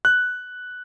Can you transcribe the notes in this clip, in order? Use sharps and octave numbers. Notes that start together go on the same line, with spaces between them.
F#6